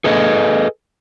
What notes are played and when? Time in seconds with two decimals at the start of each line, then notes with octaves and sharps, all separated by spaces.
0.04 G#4 A4 B4 D#5 E5 G#5